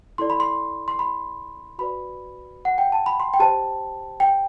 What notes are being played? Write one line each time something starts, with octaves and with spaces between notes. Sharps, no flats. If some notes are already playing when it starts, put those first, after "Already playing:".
E4 A4 D5 C6
B5
C6
C6
B5
F#4 B4 D5 B5
F#5
G5
A5
B5
C6
G5
G4 C5 A5
G5